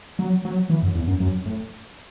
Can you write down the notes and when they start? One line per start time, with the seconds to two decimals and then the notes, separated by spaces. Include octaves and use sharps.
0.19 F#3
0.45 F#3
0.70 E3
0.83 F#2
0.95 E2
1.08 F#2
1.20 F#2
1.46 A2